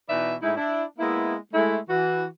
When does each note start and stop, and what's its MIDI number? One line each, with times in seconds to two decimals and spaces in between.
0.09 0.35 47
0.09 0.35 52
0.09 0.35 63
0.09 0.35 71
0.09 0.35 74
0.09 0.35 76
0.43 0.52 45
0.43 0.52 56
0.43 0.52 63
0.43 0.52 64
0.57 0.83 62
0.57 0.83 64
0.99 1.35 56
0.99 1.35 58
0.99 1.35 59
0.99 1.35 64
1.53 1.77 56
1.53 1.77 57
1.53 1.77 64
1.90 2.25 52
1.90 2.25 66